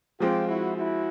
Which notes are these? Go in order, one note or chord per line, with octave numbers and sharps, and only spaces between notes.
F3 G#3 C4 F4 G4
E4 F#4
E4 F#4